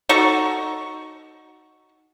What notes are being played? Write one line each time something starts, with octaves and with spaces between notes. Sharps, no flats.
D#4 F#4 A4 C#6